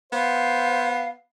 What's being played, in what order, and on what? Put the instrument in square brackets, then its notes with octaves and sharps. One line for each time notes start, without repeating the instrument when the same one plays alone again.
[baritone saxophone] B3 [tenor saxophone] C5 [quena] F5